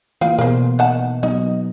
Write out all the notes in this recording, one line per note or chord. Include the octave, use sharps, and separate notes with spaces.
E3 A#3 F4 F5 G5
B2 B3 A#4 C5
D#3 F#5 A5
F#3 B3 D#4 D#5